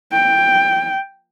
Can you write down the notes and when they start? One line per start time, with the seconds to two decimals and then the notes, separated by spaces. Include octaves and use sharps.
0.13 G5